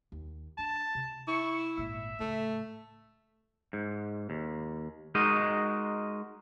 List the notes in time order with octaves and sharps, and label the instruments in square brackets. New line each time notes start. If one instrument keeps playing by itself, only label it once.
[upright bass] D#2
[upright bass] D4 [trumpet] A5
[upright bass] C3
[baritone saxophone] E4 [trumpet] C#6
[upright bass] G#1 A#2 [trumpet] E5
[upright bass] A2 C#3 [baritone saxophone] A3
[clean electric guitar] G#2
D#2
G#3 D#4 F#4 A#4 D#5